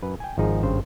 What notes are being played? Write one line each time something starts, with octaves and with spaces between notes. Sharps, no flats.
F#2 B4
G5 G#5
G#1 F3 D#4 G#4
G#1 G2 C#3 C5